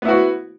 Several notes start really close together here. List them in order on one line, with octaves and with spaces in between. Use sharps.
B3 E4 F#4